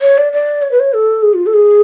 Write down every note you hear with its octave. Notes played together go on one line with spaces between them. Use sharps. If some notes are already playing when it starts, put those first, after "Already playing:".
C#5
D5
D5
C#5
B4
C#5
A4
G#4
F4
A4
G#4